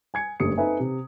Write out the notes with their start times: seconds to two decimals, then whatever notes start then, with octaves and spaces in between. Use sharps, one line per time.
0.14 G#5 G#6 C#7
0.40 F#1 G2 A3 G4 D#6 C#7
0.58 C4 D#4 A4 B4 E5 G#5
0.80 C3